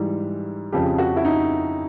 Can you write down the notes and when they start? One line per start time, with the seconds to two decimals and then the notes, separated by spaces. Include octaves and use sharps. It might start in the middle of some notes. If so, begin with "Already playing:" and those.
Already playing: G#2 E3 G3
0.72 F2 C#3 F3 G4
0.98 F#4
1.16 E4
1.25 D#4